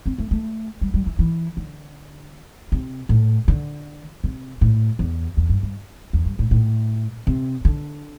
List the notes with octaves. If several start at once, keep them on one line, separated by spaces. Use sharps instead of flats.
C4
A3
A3
G3
G3
E3
E3
D3
C3
A2
D3
C3
A2
E2
E2
G2
G2
E2
G2
A2
A2
C3
D3